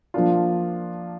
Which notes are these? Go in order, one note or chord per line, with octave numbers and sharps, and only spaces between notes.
F3 A#3 D4 F4